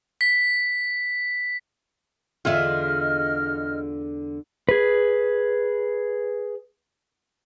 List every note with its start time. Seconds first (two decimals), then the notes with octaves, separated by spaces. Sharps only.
0.21 B6
2.45 E2 D3 F4 G#4 D#5 E5 F6
4.69 G#4 B4